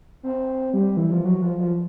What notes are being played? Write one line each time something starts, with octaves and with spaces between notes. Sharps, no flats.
C4
G3
E3
F3
F#3
F3
F3